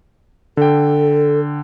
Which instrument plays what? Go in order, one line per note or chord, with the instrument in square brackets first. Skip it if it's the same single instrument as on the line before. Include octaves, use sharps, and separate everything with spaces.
[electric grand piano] D3 G5 [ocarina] A4